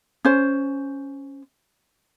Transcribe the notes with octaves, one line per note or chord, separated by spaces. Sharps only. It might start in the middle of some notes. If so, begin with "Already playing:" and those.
C#4 C5